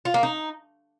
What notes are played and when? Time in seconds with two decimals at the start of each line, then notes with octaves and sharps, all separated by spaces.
0.05 F4
0.14 A#3
0.23 D#4